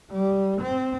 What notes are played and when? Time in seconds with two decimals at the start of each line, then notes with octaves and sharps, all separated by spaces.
0.11 G3
0.61 C4